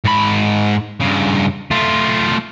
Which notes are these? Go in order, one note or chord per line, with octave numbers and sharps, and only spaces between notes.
G#2 B5
G2 C#3
A3 F4